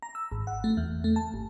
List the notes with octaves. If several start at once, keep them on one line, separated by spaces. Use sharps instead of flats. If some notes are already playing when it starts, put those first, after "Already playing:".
A#5
E6
G#1
F#5
A3
E2
A3
A5
G1